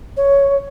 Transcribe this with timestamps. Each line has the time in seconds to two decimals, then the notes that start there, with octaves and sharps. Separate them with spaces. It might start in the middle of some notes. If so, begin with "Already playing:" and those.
0.17 C#5